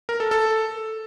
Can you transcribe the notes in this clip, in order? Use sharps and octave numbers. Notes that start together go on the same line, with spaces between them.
A#4
A4
A4